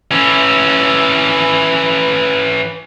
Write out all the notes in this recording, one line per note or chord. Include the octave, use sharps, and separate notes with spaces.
E3 C#4